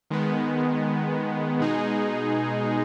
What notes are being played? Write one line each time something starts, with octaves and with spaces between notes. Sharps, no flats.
D#3 G#3 B3
B2 G#3 D#4 G#4